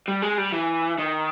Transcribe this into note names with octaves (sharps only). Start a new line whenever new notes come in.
G3
G#3
G3
E3
D#3